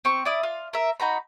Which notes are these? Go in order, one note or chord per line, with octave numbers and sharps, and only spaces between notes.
C4 C#6
E4 D5 D#6
F4 F5
A#4 E5
D#4 F#4 A#5 B5